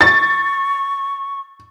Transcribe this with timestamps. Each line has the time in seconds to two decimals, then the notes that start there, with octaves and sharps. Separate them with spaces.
0.01 C#6 A6